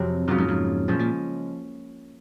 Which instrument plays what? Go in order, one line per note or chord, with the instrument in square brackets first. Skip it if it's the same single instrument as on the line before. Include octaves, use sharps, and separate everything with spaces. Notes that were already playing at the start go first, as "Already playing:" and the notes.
Already playing: [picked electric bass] F2 [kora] C3 F#3 C4
[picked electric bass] F#2 [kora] C#3 F#3 A#3 F4
[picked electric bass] F2 G#2
F2 G#2
[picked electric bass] F#2 A#2 [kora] F3 G#3 C#4
[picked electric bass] A#2